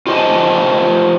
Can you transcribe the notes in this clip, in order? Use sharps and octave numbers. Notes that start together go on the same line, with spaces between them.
F4 G4 C5 D#5 G#5 A5